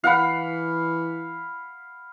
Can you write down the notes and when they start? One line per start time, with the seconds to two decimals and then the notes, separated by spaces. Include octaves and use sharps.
0.04 E3 F5 F#5 B5